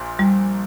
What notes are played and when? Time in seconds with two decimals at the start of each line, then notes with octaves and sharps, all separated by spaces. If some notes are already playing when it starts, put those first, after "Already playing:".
Already playing: A#1 A#2
0.19 G3